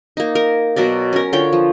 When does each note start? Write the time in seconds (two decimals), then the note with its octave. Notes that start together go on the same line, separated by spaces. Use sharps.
0.17 A#3 D#4
0.35 A#4
0.76 B2 F#3 A#4 D5
1.13 C#4 A#4
1.33 D3 F4 C#5 G5
1.53 F3